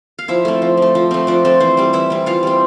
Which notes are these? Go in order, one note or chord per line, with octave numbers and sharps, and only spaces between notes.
F5
F3 E4 E5
A3 C4
F3
A3 C4
F3
A3 C4
F3 D4 D5
A3 C4
E3 C4 C5
G3 C4
E3 E4 E5
G3 C4
E3 F4 F5
G3 C4